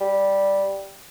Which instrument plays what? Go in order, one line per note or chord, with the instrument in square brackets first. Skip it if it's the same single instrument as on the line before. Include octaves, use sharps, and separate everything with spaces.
[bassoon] G3